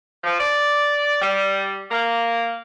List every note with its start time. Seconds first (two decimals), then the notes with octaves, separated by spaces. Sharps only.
0.24 F3
0.39 D5
1.22 G3
1.91 A#3